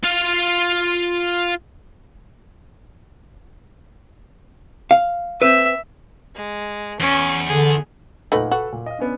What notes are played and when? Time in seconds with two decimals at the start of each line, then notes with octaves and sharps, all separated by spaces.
0.04 F4 F5
4.91 F5
5.42 C4 B4 E5
6.35 G#3
7.00 E2 C#4
7.48 D3 G#4
8.32 A#2 A3 D#4 B4 F#5 F#7
8.51 F#4 A4 B4
8.73 A#2
8.86 D#5 F5
8.98 B3 C#4 D4